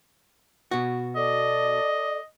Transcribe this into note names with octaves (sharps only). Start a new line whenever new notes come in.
B2 F#4
A4 D5 D#5 D6